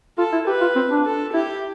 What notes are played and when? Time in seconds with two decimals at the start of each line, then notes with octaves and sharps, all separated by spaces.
0.18 F4 A4
0.32 E4
0.47 G4 B4
0.61 F4
0.76 C4
0.90 D4
1.05 A4
1.34 E4 G4